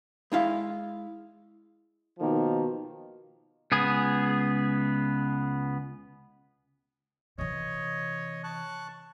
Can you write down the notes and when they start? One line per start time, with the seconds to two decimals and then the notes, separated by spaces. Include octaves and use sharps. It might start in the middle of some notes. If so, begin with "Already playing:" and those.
0.32 G#3 E4 F5
2.19 B2 D#3 F3 A#3
3.72 C#2 B3 G#4
7.38 C3 E3 C#5 D#5
8.44 A5 C#6 F#6